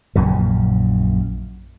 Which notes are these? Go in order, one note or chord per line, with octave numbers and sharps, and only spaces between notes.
A#1 F#2 A#2 C#3